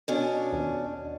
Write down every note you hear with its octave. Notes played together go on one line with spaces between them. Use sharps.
B2 C#4 D4
D#2